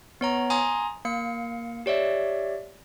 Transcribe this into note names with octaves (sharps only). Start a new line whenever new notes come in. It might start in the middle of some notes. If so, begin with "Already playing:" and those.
B3 C#5 A#5
G#5 A#5 C6 D#6
A#3 F5 C#7
G4 C#5 D5 E5